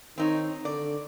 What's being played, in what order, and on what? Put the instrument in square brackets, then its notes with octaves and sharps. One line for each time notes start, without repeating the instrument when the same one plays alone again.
[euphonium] D#3 [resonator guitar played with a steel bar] C4 D#4 C#5
[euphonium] D3 [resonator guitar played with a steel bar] D5